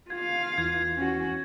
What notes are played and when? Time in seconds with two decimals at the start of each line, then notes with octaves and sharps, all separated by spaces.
0.10 F4 F5 G#6
0.58 E2 E3 G#6
0.96 C#4 F#4